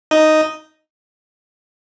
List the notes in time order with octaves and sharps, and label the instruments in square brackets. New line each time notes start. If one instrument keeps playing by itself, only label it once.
[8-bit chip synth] D#4 D#5